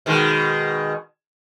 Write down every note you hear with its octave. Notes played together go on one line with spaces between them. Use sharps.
B2 D#3 G#3